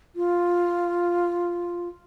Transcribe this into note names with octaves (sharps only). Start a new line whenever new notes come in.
F4